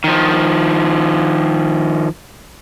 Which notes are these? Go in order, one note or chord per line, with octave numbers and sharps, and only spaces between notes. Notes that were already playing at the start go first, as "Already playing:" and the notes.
D#3 F3